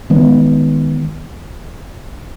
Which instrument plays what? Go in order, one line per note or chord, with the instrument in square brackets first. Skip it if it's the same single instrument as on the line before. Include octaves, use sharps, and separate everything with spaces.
[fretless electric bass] D#3 G#3 B3